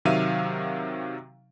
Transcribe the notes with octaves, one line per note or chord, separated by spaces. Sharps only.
C3 D#3 F#3 E5 F5 D#7